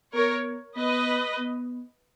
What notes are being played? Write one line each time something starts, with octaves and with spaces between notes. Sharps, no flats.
B3 A#4 C#5
B3 B4 D#5
B3